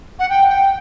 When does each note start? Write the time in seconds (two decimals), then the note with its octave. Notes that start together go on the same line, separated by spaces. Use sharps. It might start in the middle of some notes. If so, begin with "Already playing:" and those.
0.19 F#5
0.29 G5
0.49 G5